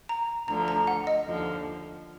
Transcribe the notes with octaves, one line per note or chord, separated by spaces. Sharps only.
A#5
D2 D3 F3 A#5
A#5
F#5
D#5
D#2 D3 F3